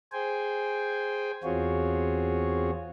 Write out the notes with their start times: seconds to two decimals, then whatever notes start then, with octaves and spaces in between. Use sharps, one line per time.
0.12 G#4 C5 G5 G#5
1.43 E2 C4 F4 F#4 G#4 C#5